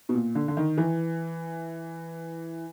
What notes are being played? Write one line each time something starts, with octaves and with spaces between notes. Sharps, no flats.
B2
A#2
D3
D3
D#3
E3